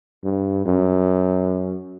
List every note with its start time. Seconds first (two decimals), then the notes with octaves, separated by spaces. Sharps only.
0.24 G2
0.66 F#2